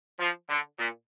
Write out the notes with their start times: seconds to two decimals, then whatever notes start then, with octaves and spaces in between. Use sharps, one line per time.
0.19 F3
0.49 D3
0.77 A#2